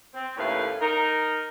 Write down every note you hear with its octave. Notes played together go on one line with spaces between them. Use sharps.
C4
D#2 A2 A3 C#4 B4 F5
D#4 A#4